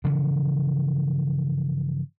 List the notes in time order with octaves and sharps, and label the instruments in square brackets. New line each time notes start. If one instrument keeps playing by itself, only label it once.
[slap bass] G2 C#3 E3 F3